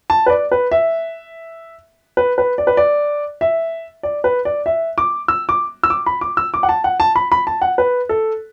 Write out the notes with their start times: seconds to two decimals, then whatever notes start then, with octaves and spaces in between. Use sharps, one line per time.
0.10 A5
0.26 B4
0.30 D5
0.52 B4
0.71 E5
2.17 B4
2.38 B4
2.58 D5
2.67 B4
2.77 D5
3.41 E5
4.03 D5
4.24 B4
4.45 D5
4.66 E5
4.98 D6
5.28 E6
5.49 D6
5.83 E6
5.90 D6
6.06 B5
6.21 D6
6.37 E6
6.54 D6
6.63 F#5
6.69 A5
6.84 F#5
7.00 A5
7.16 B5
7.32 B5
7.47 A5
7.62 F#5
7.78 B4
8.09 A4